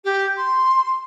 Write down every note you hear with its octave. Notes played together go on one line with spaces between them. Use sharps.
G4
C6